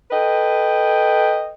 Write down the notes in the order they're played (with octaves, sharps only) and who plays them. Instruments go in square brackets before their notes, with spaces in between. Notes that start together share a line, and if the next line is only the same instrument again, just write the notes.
[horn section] A4 B4 D#5 G5